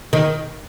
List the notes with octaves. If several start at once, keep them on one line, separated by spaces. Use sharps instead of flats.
D#3